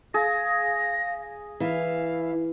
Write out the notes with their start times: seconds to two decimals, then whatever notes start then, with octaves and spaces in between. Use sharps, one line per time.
0.14 G#4 F5 A#6
1.60 E3 E5 F5